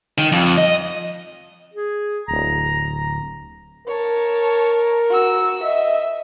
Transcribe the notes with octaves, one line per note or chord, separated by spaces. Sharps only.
D#3
F2
D#5
G#4
D1 A#5
A#4 C#5 A5
F#4 E6
D#5 E5